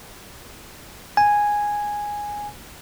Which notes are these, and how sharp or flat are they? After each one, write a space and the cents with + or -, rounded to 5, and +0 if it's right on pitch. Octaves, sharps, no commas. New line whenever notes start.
G#5 -5